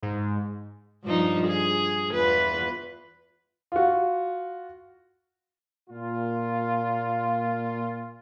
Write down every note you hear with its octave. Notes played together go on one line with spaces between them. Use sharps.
G#2
G2 F3 D#4
G#4
E2 F4 B4
F4 F#4
A#2 F4